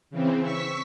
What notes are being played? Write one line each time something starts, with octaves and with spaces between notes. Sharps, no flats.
C#3 E3 C4
C#6 E6 B6